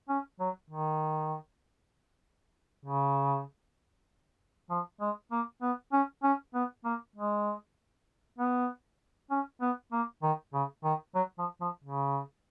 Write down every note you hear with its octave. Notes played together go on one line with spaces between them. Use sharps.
C#4
F#3
D#3
C#3
F3
G#3
A#3
B3
C#4
C#4
B3
A#3
G#3
B3
C#4
B3
A#3
D#3
C#3
D#3
F#3
F3
F3
C#3